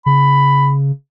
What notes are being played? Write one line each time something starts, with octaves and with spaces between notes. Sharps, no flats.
C#3 B5